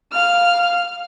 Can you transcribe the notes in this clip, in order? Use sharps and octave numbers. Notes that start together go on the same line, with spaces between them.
F5 F6